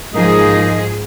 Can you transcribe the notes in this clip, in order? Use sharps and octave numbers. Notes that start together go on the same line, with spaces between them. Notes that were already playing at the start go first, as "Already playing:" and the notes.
G#2 F3 A#3 D#4 G#4 D#5